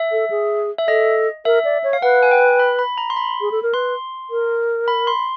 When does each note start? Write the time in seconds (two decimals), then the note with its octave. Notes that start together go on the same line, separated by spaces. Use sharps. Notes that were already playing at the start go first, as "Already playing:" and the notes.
Already playing: E5
0.12 A4
0.30 G#4
0.78 E5
0.88 A4 D#5
1.45 A#4 E5
1.65 D5
1.84 C#5
1.93 F5
2.02 B4 F#5
2.23 G#5
2.31 G5
2.59 B5
2.79 B5
2.98 A#5
3.10 C6
3.17 B5
3.41 G#4
3.51 A4
3.63 A#4
3.74 B4 C6
4.30 A#4
4.88 B5
5.07 C6